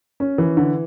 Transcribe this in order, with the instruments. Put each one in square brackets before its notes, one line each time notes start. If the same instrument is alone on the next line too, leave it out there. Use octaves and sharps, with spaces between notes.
[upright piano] C#4
E3
D3